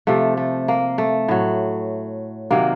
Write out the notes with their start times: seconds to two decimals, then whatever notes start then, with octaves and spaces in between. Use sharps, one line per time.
0.07 C3 F3 A3
0.37 A3
0.68 A#3
0.98 A3
1.28 A2 F#3
2.51 C3 D#3 F#3 A#3